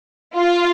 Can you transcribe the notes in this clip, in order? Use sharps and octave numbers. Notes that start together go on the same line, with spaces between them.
F4